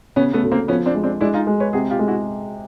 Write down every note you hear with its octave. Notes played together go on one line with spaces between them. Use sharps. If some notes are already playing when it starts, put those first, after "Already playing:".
C#3 B3 C#4
A3 B3
D2
A#3 C4
F3 B3 C#4
C4 D4
G#3
C4 D4
G#3 D4 E4
D#4 F4
G#3
B4 C#5
C3 F#4 G#4
F4 G4
G#3
E4 F#4